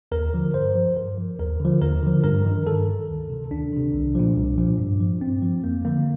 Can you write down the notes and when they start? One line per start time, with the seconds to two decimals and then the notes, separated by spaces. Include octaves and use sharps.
0.12 D#2 A#4
0.33 D3 F3
0.54 G2 C5
0.75 F3
0.97 G2 A#4
1.18 F3
1.39 D#2 A#4
1.60 D3 F3
1.81 D#2 A#4
2.03 D3 F3
2.24 G2 A#4
2.45 D#3
2.66 G2 A4
2.87 D#3
3.09 D2
3.30 C3 D#3
3.51 D2 D4
3.73 C3 D#3
3.94 C2
4.15 A#2 F3
4.36 C2
4.58 A#2 F3
4.79 G2
5.00 F3
5.21 G2 C4
5.42 F3
5.63 F2 A#3
5.85 D3 F3 A#3